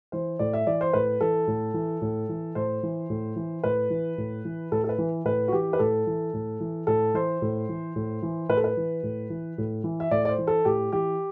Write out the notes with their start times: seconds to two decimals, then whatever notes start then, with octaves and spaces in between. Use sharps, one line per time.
0.12 E3 C5
0.39 A2 D5
0.53 E5
0.67 E3 D5
0.81 C5
0.93 A2 B4
1.21 E3 A4
1.47 A2
1.74 E3
2.02 A2
2.29 E3
2.55 A2 C5
2.83 E3
3.10 A2
3.36 E3
3.64 A2 B4
3.90 E3
4.18 A2
4.45 E3
4.72 A2 A4
4.84 A4
4.89 B4
4.98 E3
5.25 A2 B4
5.48 F#4
5.52 E3 G4
5.73 B4
5.79 A2 A4
6.07 E3
6.34 A2
6.60 E3
6.87 A2 A4
7.14 E3 C5
7.42 A2
7.69 E3
7.96 A2
8.23 E3
8.49 A2 B4
8.57 A4
8.64 B4
8.77 E3
9.03 A2
9.30 E3
9.58 A2
9.84 E3
10.00 E5
10.11 A2 D5
10.25 D5
10.29 C5
10.38 E3
10.47 A4
10.65 A2 G4
10.92 E3 G4